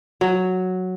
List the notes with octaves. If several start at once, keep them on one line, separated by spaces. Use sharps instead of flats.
F#3